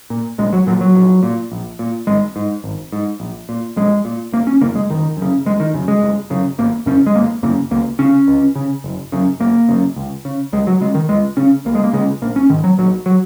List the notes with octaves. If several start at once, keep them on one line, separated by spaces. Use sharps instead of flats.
A#2
A#1 G#3
F#3
A#2 F#3
F#3
A#1
A#2
A#1
A#2
G#1 G#3
G#2
G#1
G#2
A#1
A#2
A#1 G#3
A#2
F#1 A#3
C#4
F#2 C#3 A#3
G#3
F#1 D#3
F#2
C#3
F#1 G#3
D#3
F#2 C#3
G#3
F#1
F#2 C#3
G#1 A#3
F#2 C#3 C#4
G#3
G#1 A#3
F#2 C#3 A#3
C#2 A#3
C#3 C#4
C#2
C#3
F#1
F#2 C#3
F#1 A#3
F#2 C#3
C#2
C#3
C#2 G#3
F#3
C#3 G#3
D#3
C#2 G#3
C#3 C#4
C#2 A#3
G#3
A#3
C#3 G#3
A#1 A#3
C#4
G#2 D#3
F#3
A#1 F#3
F#3